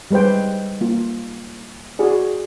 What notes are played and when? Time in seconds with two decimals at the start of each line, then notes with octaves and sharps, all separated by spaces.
0.11 G3 G#3 B4 C5 G5
0.81 A#3 F4
1.99 F#4 G#4 D5